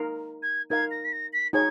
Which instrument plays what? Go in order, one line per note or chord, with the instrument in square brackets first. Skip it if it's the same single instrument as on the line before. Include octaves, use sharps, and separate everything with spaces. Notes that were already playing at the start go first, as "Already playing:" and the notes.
Already playing: [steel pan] D#4 A#4 F5
[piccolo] G#6
[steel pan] D#4 A#4 F5 [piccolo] G#6
[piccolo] A#6
B6
A#6
B6
[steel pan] D#4 G#4 C#5 [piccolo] G#6